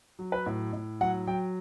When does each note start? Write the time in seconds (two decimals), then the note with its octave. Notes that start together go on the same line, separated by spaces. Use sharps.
0.19 F#3
0.32 B4
0.46 A2
0.73 A2
1.01 F#3 F#5
1.27 F#3 G5